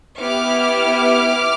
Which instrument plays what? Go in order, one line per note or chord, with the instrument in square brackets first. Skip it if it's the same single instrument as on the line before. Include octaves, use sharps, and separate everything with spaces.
[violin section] B3 E4 G4 D6 F6